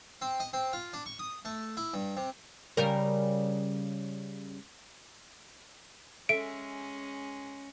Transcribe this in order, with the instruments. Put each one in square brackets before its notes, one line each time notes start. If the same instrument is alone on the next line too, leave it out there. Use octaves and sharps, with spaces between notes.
[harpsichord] C4
D#5
C4
F4
D4
C#6
D#6
A3
E4
G2
C3
[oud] C#3 G3 A#4
[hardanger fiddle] G#3 C#4 [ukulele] A4 E5 [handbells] D7